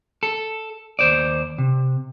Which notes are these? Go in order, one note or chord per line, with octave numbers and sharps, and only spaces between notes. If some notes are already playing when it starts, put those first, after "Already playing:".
A4
D#2 C5 D5
C3